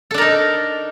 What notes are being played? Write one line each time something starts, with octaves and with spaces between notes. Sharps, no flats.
D4 D#4 A4 A#4